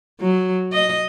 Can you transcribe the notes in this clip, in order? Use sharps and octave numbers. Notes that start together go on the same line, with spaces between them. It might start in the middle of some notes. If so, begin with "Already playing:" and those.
F#3
D#5